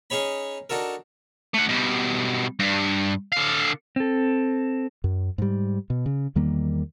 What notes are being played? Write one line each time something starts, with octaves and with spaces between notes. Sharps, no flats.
C#4 D#4 G#4 C#5 B5
D4 D#4 F#4 A4 A#4
A3 F#5
B2 G3
G2
D3 F5
C4 A4
F#2
G#2 G3
B2
C#3
E2 D#3 G3 A#3